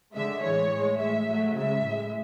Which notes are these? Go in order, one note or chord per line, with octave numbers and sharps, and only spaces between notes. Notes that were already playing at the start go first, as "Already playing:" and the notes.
D3 G#3 E5
A2 E3 G#3 C#5
A2
G#3
A2 G#3 E5
A2 F#3 A3
C#3 G#3 E5
A2 G#3